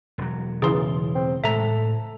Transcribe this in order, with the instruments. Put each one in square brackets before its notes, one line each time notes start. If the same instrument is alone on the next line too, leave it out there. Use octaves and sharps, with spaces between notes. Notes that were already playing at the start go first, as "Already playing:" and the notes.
[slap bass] E1 F#3
[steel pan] C#3 E3 [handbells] G#4 C6
[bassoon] C4
[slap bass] A2 G#3 A3 [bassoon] A4 [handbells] E5 A#5